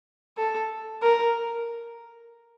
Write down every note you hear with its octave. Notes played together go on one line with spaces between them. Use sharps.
A4
A#4